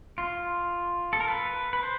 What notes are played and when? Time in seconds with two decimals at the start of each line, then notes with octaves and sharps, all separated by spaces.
0.18 F4
1.13 A4
1.20 A#4
1.28 B4
1.73 B4
1.83 C5